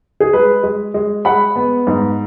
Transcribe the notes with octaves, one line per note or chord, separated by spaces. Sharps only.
G#4
G#3 B4
G#3
G#3
G#3 F#5 B5
B3
G#2